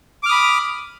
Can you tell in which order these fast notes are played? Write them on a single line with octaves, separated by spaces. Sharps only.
D6 F6 D#6 B5